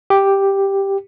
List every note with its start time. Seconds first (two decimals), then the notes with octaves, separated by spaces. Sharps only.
0.10 G4